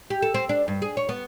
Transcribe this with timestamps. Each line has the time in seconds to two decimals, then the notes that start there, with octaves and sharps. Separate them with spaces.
0.10 G4
0.22 A4
0.34 C4
0.49 D4
0.68 G2
0.82 G#4
0.97 C#5
1.09 B3